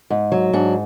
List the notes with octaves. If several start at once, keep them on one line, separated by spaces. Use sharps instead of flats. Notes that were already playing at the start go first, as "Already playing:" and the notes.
G#2
F#3
G#2 D4